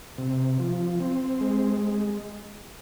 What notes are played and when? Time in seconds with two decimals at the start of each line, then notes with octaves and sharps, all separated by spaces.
0.18 C3
0.60 F3
1.00 C4
1.41 G#3